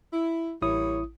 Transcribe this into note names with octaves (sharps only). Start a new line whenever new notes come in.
E4
A1 G3 A#3 E4 C#5 D#6